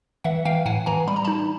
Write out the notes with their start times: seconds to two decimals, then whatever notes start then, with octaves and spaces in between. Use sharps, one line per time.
0.24 E3 E5 F#5
0.45 E3 F5 G5
0.65 A2 F#5 G#5
0.86 E3 G#5 A#5
1.08 G3 B5
1.16 A#5
1.24 D#4 A5 B5